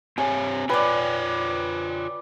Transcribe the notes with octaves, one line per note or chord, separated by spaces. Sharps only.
C4 G4 C#5 G#5
F4 B4 C#5 D5 G5